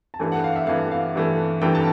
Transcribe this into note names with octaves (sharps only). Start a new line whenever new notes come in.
A5
G2 E3 A3 G#5
F#5
F5
E5
G2 E3 A3 F5
F5
G2 E3 A3
G2 E3 A3 G5
A5